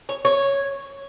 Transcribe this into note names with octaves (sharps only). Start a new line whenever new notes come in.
C#5
C#5